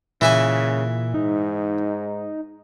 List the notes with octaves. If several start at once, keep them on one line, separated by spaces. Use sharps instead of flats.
A#2 C#3 E3 E4 G#5
G#2 D#4